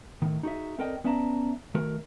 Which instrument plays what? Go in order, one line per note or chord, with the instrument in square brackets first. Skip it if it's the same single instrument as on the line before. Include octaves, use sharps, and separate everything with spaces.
[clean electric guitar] A2 D#3
D#4 F#4 G#4 E5
C4 A4 A#4 D5 D#5 G5
B3 C#4 D5 E5 A5 A#5
D#3 A3 F#4 A#4